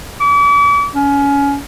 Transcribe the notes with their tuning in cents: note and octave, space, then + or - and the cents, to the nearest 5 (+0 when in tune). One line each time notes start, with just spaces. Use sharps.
D6 -40
C#4 +25